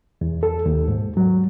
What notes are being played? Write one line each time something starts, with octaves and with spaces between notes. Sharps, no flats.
E2
A4
D#2
G#2
F#3